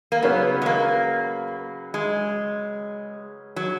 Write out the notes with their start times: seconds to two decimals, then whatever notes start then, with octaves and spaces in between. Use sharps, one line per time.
0.12 A#3
0.22 C#3 F#3 B3 C#4 F#4 B4
0.62 G#3
0.66 A#3
1.94 G#3
3.56 F#3